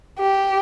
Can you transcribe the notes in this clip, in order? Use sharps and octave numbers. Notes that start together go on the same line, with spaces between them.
G4